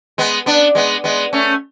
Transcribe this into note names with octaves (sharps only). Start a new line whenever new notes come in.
G#3 B3
B3 D4
G#3 B3
G#3 B3
A3 C#4